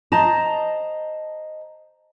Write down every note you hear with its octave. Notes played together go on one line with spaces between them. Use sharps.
C5 D#5 A5 A#5